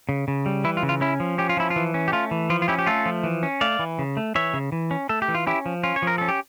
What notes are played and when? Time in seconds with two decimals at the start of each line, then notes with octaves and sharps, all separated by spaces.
0.09 C#3
0.28 C#3
0.46 G3
0.64 E3 E4
0.77 F4
0.83 C#3
0.89 F4
1.01 C#4 E4
1.20 F3
1.38 C#4 G4
1.49 F4
1.57 F3 E4
1.70 F4
1.76 E3
1.94 C#4
2.08 G4
2.12 A3 F4
2.31 E3
2.50 F3 F4
2.62 F4
2.68 C#4 E4 G4
2.79 G4
2.86 A3 F4 A4
3.06 F3
3.23 E3
3.43 C#4
3.61 A3 D5 F5
3.79 E3
3.99 C#3
4.17 A3
4.35 E3 C#5 E5
4.54 C#3
4.72 E3
4.91 C#4
5.09 A3 A4
5.22 G4
5.28 E3
5.35 F4
5.47 C#4 E4 G4
5.66 F3
5.83 C#4 F4
5.96 C#5
6.02 F3 A#4
6.18 C#4 A4
6.28 G4